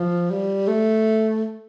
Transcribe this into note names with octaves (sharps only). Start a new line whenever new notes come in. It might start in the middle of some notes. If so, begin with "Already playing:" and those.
Already playing: F3
G3
A3